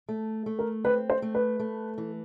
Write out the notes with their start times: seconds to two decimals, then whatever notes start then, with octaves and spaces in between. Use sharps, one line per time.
0.09 A3
0.46 A3
0.59 A#4
0.84 C4 B4
1.10 C5
1.22 A3
1.35 B4
1.60 A3
1.98 E3